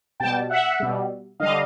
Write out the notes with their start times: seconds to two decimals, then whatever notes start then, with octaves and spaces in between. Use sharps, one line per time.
0.20 B2 G5 A5
0.24 G3
0.50 E5 F#5
0.80 B2 G3
1.40 D3 G3 D#5 F5